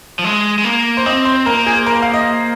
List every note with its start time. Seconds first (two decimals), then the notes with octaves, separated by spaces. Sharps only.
0.19 F3
0.24 G#3
0.58 G#3
0.64 A#3
0.97 C5
1.06 C4 D#5
1.25 C5
1.46 A#3 A#4
1.67 G#4
1.86 A#4
2.02 F5
2.13 D#5